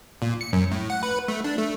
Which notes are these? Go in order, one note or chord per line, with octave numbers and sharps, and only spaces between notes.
A#2
C#7
F#2
A2
F#5
B4
A3
D4
A3